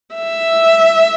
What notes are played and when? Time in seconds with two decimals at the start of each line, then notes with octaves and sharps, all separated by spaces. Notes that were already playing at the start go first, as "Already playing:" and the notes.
0.15 E5